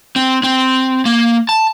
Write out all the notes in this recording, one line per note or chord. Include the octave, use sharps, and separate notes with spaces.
C4
C4
A#3
A5